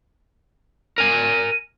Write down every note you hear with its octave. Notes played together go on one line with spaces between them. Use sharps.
A#4 G#5 D#7